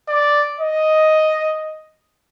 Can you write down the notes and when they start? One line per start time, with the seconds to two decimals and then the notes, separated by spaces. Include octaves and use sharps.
0.09 D5
0.60 D#5